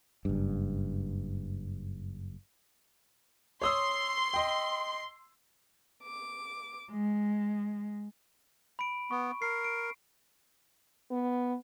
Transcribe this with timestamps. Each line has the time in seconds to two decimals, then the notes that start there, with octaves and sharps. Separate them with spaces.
0.25 F#1 G2
3.62 C#5 C6 D#6 E6
4.34 D#5 G5
6.04 D6
6.90 G#3
8.79 B5 D7
9.11 B3 C#6
9.42 A#4 C7
9.64 D7
11.11 B3